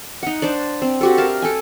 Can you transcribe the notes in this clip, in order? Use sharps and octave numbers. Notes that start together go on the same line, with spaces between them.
D#4 F#5
D4 C5 D5
C4
F#4 G4 A4
A#4 E5 F5 A5
A4 G5 G#5